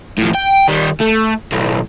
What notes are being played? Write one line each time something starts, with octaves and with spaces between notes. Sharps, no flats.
A2 F3
G5
D#3 G3
A3
B1 A2